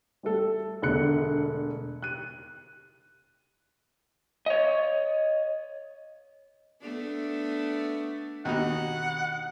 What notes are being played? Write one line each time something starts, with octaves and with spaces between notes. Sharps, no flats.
G3 A3 A4
E1 D3 A3 F#6 C#7
F#6 D#7
C#5 D#5
A3 B3 D4
D#2 B2 D#4 F#5